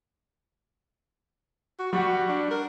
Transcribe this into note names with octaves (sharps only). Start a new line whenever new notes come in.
F#4
G3 F#4 F#5
D4
A#4